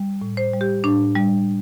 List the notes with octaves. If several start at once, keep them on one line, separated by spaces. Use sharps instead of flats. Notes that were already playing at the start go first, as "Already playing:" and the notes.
Already playing: G3
A2
C5
G3
G4
A2 D4
G3